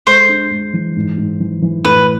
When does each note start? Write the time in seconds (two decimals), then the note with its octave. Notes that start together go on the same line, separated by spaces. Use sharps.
0.07 G#3 C5
0.29 D4
0.51 G#3
0.74 E3
0.96 G#2
1.18 G#2
1.40 E3
1.62 E3
1.85 A2 B4